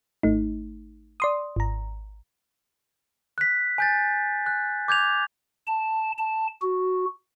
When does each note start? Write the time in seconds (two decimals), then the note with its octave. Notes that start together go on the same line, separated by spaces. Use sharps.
0.23 G#1 A3 D#4
1.20 D5 C6 D#6
1.56 G#1 A#5
3.38 F#6 B6
3.78 G#5 G6 A6
4.46 F#6
4.88 D6 G6 G#6 F7
5.67 A5
6.18 A5
6.62 F#4